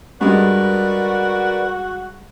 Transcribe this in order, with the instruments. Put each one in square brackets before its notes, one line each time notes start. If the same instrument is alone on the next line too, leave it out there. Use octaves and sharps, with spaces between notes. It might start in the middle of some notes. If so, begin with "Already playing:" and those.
[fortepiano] G2 G#3 [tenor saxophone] F#4 [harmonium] A#4 B4 D5